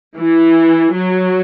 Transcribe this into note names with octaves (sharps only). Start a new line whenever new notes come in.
E3
F#3